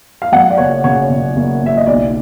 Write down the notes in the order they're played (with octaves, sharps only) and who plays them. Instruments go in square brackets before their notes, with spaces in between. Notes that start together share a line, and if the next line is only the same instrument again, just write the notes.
[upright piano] F5
F#2 F#5
D5
F#1 C#5
C#3 C#5
C#3
F#1
F#1 E5
D#5
B1 D5